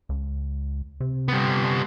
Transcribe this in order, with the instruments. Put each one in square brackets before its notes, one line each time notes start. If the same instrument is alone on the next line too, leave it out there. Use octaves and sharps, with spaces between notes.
[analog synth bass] C#2
C3
[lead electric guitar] G3 B3